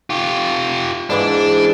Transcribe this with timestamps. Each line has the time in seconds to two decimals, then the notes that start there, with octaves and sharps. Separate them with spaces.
0.10 F4 G4
1.10 G#2 E3 D4 D6